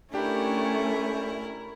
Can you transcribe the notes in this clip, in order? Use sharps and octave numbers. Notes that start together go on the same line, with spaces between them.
A3 C#4 D4 E4 G4 A#4